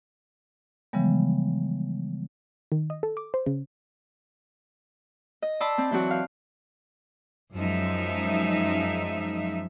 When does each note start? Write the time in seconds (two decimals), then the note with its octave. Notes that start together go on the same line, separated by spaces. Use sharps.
0.93 C#3 E3 F3 G3 G#3 B3
2.72 D#3
2.90 D#5
3.03 A4
3.17 D6
3.34 C5
3.46 C#3
5.42 D#5
5.60 D5 A5 B5 C6 D#6 E6
5.78 C4
5.91 E3 F#3 C4 F#4
6.11 F5
7.54 F#2 F3 G#3 D#4 E5